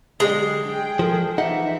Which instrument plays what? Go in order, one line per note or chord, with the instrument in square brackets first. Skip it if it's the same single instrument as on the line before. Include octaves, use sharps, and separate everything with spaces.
[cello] D3 F#3 [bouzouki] G#3 [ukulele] G4 D5 D#5
[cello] G#4 G5
[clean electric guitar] F3 [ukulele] A4 A#4
[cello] E3 E5 [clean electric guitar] D#4 [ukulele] F#5